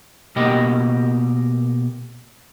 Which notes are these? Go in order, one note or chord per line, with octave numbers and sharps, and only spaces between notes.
B2 A#3 G4 D#5 G5